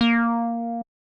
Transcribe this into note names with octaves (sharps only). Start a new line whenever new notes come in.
A#3